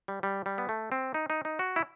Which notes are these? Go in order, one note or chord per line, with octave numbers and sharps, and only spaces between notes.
G3
G3
G3
B3
A3
C4
D#4
D#4
D#4
F#4
E4